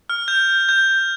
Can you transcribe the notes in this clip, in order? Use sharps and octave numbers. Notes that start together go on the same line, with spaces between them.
F6
G6
G6